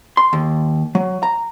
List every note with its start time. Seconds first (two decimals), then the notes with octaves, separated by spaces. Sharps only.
0.17 C6
0.33 D#2
0.95 F#3
1.23 A#5